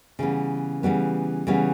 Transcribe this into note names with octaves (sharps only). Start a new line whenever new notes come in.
C#3 E3 G3 B3
C#3 E3 G3 B3
C#3 E3 G3 B3